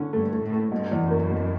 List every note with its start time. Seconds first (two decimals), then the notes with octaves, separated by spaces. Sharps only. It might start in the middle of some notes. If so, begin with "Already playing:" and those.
Already playing: D3 C#4
0.13 G2 A3
0.33 A3
0.42 A2
0.52 A3
0.72 G2 B2
0.91 E2
1.01 F#2
1.11 A#3
1.30 B2